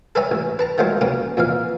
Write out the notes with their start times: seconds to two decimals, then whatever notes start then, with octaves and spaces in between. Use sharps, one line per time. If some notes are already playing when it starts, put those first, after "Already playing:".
0.15 A4 B4 C#5 E5 G#5 A#5
0.31 A1
0.59 B4 A5 A#5
0.78 D#3 F3 F#3 G#3 A3 C5
1.01 A#3 B3 C#4 F#4
1.37 F2 A#2 E3 F5